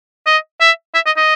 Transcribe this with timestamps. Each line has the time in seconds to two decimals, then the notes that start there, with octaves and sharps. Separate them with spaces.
0.27 D#5
0.60 E5
0.95 E5
1.06 D#5
1.17 D#5